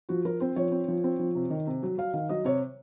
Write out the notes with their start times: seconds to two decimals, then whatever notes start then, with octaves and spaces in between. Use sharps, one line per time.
0.09 F3 F#4
0.25 F3 A#4
0.40 C4 C5
0.56 F3 C#5
0.72 C4
0.88 F3
1.04 C4
1.19 F3
1.35 C3
1.50 D#3
1.67 C3
1.83 F#3
1.98 F#3 F5
2.14 D#3 F5
2.29 F#3 D#5
2.45 C3 C#5